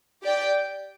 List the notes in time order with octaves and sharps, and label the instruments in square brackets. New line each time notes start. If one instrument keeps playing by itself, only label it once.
[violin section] G4 D5 G5